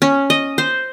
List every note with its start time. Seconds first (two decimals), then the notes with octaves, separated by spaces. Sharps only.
0.02 C#4
0.30 D#5
0.58 C5